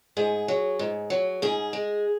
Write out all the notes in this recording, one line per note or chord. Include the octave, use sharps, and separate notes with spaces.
G#2 G#4
F#3
G#2
F#3
G#2 G#4
G#3